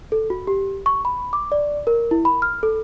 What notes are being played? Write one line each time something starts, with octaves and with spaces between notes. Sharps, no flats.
A4
F#4
G4
C#6
B5
D6
D5
A#4
E4
B5
F6
A4